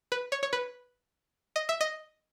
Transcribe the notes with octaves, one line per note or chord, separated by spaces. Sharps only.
B4
C#5
C#5
B4
D#5
E5
D#5